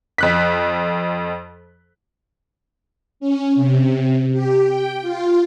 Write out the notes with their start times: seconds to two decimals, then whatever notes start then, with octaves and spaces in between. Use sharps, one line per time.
0.18 F2 F#6 B6
3.20 C#4
3.55 C3
4.32 G4
4.68 G5
5.02 F4